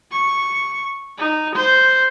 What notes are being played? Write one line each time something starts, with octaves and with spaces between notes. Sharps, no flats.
C#6
D#4
C5